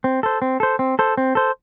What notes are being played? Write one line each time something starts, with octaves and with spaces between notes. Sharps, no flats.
C4
A4 C5
C4
A4 C5
C4
A4 C5
C4
A4 C5